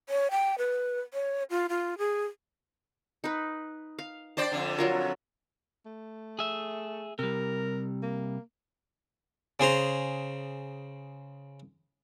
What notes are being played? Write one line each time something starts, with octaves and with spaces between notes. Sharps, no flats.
C#5
G5
B4
C#5
F4
F4
G#4
D#4 B4
F5
D4 C5 D5 G5 A5
F2 D3
F#3 F4 A#4
A3
G#4 E5
C3 G3 A#4
A#3
C#3 G#4 C5 A#5